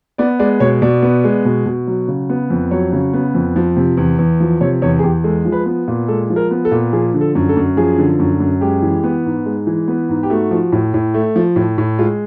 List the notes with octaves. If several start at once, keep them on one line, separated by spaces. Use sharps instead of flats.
B3 D5
G#3 D5
B2 C#5
B2 D5
B3
G#3
B2
B2
F#3
C#3
B3
F2
F#3 C#5
C#3
B3
F2
F3
C3
E2
E2
F3
C3 C#5
E2 C#5
G#4
E2 G4
G#3 A4
F3
B4
B3
A#2
G#3 A4
F3
A#4
B3
A4
A#2
F3 G#4
D3
A4
F#2
A4
F#2
F3 G#4
D3
F#2
F#2
G#3 G4
E3
B3
G#2
G#3
E3
B3
G#2
G4
A3 F#4
F3
A2
A2
A3
F3
A2
A2
G#3 F4